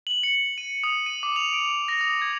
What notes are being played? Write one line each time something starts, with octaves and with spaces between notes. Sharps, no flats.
F#7
C#7
D#7
D#6
D#7
D6
F7
D7
A#6
D#6
G#6